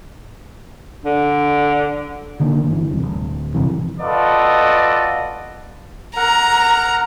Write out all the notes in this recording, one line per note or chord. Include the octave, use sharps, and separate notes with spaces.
D3
D3 D#3 A#3 D4
G1 E3
E1 C2
D1
G1 F2 C3 E3
F4 F#4 A4 B4 D5 D#5
A#4 F#5 A#5